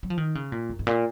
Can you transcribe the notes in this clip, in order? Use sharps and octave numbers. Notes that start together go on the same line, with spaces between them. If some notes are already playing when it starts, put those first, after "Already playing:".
F#3
F3
D#3
C#3
A#2
F#2
G#2
A#2